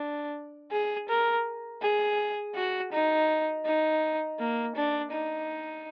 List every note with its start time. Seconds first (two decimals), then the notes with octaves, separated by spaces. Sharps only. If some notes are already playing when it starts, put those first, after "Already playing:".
Already playing: D4
0.71 G#4
1.09 A#4
1.81 G#4
2.55 F#4
2.92 D#4
3.65 D#4
4.39 A#3
4.76 D4
5.12 D#4